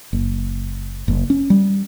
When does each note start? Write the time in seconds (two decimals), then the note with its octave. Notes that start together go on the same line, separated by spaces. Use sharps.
0.13 F#1
1.08 F#1
1.30 C#4
1.50 G3